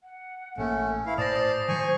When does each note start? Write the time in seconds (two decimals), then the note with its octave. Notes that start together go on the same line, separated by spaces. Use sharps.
0.04 F#5
0.58 A1 A3 A#3 C#4
1.06 E4 B4 F5
1.18 A2 C5 D5 A5 D#6 A#6
1.36 D#6
1.68 D#3 F#3 G#5 C#6